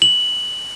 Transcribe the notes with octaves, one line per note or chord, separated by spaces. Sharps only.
F#7